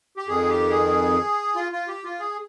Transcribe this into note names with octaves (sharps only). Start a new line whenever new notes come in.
G4
F2 D#3 G#4
G4
G#4
F4
F4
G4
F4
G#4